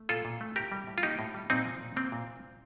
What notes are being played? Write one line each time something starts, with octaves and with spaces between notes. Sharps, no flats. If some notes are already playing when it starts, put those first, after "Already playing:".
Already playing: A3
A#2 F4 A4
A#2
A3
A2 G4 A#4
G3
A2
F4
A#3 D#4 G4
A2
G3
A#2 C4 D#4
F3
A#2
A#3 C4
A#2